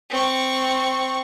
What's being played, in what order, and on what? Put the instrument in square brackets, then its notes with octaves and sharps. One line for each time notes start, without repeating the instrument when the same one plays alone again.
[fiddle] C4 C#6